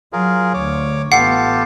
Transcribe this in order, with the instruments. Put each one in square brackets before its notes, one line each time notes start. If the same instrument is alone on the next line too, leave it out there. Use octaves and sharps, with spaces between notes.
[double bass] F#3 [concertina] F4 G#4 A#4
[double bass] D2 [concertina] C#5 D6
[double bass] A1 B3 [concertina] F4 G4 A4 [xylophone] F#5 [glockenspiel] C7